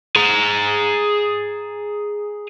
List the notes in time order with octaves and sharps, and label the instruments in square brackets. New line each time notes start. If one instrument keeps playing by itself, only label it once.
[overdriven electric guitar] G#4 A#5